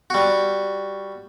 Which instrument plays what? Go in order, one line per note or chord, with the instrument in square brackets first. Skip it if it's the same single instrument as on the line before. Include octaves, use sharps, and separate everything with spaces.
[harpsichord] G3 F#4